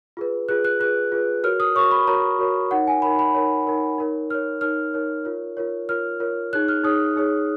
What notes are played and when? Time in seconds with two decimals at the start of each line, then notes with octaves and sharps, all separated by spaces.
0.17 F4 G#4 B4
0.49 F4 G#4 B4 F#6
0.65 F#6
0.80 F4 G#4 B4 F#6
1.12 F4 G#4 B4
1.44 F#4 A#4 C#5 F6
1.60 D#6
1.75 F#4 A#4 C#5 C#6
1.91 B5
2.07 F#4 A#4 C#5 A#5
2.39 F#4 A#4 C#5
2.71 D#4 A#4 C#5 F#5
2.87 G#5
3.02 D#4 A#4 C#5 B5
3.19 B5
3.35 D#4 A#4 C#5
3.67 D#4 A#4 C#5
3.98 D#4 A#4 C#5
4.30 D#4 A#4 C#5 F6
4.61 D#4 A#4 C#5 F6
4.94 D#4 A#4 C#5
5.25 F4 A#4 C#5
5.57 F4 A#4 C#5
5.89 F4 A#4 C#5 F6
6.20 F4 A#4 C#5
6.53 D#4 G#4 C#5 F#6
6.68 F6
6.84 D#4 G#4 C#5 D#6
7.16 D#4 G#4 C#5